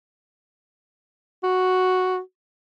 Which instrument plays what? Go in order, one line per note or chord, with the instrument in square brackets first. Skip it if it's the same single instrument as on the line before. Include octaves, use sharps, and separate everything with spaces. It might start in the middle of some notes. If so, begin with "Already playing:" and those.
[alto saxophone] F#4